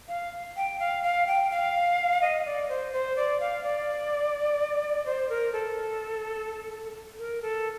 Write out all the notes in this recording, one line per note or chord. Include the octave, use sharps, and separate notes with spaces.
F5
G5
F5
F5
G5
F5
D#5
D5
C5
C5
D5
F5
D5
C5
A#4
A4
A#4
A4